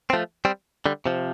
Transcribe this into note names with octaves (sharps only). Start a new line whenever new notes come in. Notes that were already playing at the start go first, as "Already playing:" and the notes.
C4
F3 A3
G3 C4
D3 G3
C3 F3